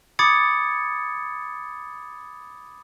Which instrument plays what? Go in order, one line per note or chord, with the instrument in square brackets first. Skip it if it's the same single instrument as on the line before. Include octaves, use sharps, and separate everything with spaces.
[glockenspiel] B5 D6 D#6 G#6 A6 C#7